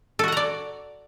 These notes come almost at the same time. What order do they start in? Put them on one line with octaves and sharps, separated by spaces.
A4 F#4 F#5 A#5 D5